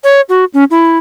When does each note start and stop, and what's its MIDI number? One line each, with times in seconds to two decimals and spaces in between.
0.04 0.21 73
0.29 0.45 66
0.54 0.64 61
0.71 0.98 64